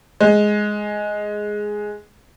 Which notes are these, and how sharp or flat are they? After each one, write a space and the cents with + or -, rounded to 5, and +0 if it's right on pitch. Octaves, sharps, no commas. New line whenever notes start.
G#3 +5